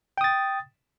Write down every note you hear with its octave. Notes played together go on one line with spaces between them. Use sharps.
G5 D#6 A6